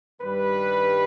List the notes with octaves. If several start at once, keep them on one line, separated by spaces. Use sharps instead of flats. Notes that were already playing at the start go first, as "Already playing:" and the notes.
G2 D#3 G3 B4